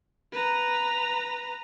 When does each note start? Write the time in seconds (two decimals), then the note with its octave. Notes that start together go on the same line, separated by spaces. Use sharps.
0.32 B4 A#5